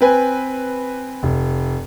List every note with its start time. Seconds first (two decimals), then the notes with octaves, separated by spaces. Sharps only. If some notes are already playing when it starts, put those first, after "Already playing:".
0.01 C4 B4 G#5
1.23 F1